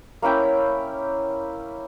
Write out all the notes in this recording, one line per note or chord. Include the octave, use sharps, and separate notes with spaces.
A#3 C#4 E4 G5